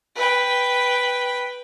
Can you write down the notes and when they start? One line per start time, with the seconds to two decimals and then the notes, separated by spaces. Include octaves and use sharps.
0.15 B4 G5